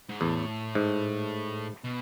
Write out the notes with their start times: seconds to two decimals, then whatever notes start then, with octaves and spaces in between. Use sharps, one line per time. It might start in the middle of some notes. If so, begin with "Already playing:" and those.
0.09 G#2
0.20 E2 A2
0.75 G#2
1.84 B2